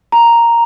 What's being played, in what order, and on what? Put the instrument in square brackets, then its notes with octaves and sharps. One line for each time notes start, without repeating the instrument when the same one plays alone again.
[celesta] A#5